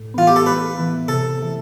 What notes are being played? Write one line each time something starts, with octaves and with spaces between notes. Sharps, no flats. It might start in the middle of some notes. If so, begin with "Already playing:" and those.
Already playing: A2
E3 B3 F4
G4
A4
A2 B4
E3 B3
C3 A4
E3 A3